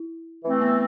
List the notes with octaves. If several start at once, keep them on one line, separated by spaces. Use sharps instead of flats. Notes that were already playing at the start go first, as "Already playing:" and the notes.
Already playing: E4
E3 A3 C4
B3